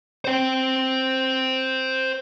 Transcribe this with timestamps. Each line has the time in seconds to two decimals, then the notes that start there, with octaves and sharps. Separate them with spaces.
0.25 C5 G5